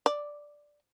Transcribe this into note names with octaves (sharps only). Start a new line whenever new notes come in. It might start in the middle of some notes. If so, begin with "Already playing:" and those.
D5